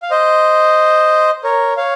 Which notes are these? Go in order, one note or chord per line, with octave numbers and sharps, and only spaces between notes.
F5
C5 D#5
A#4 C#5
C#5 F5